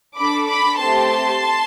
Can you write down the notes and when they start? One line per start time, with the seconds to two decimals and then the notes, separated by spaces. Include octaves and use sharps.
0.17 D4 A4 B5 D6
0.48 B5 D6
0.79 A3 C4 G4 A5 C6